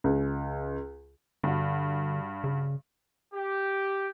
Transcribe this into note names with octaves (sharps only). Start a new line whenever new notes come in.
C#2
G2 D3 F#4
C#3
G4